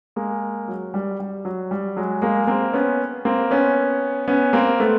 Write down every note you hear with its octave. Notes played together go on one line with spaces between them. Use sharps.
G#3 A#3
F#3
G3
G3
F#3
G3
F#3 G#3
G#3 A#3
A#3 C4
B3 C#4
A#3 C4
B3 C#4
B3 C#4
A#3 C4
A3 B3